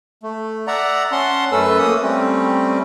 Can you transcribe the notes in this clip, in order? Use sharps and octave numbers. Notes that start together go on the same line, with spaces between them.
A3
D5 E5 F#5 A#5
C#4 F#5 A5 C6
F#2 A3 C#4 A4 B4 E6
A3 A#3 D#6
G3 A3 C4 C#4